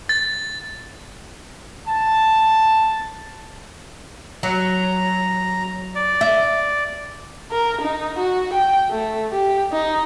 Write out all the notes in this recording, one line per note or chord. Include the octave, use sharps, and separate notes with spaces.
A6
A5
F#3 A#5
D5
E5
A#4
D#4
F#4
G5
A3
G4
D#4